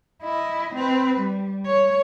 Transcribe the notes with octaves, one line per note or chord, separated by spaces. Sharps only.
E4 D#5
C4 B4
G3
C#5